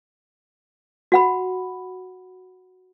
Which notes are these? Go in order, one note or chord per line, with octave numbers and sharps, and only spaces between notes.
F#4 F#5 B5